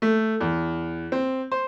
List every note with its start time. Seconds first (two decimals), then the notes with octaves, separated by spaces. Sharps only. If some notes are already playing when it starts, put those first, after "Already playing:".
0.02 A3
0.40 E2
1.12 C4
1.52 C5